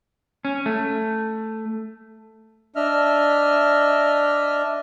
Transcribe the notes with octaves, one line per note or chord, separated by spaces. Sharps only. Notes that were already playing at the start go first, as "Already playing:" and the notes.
C#4
A3
D4 D#5 E5 F6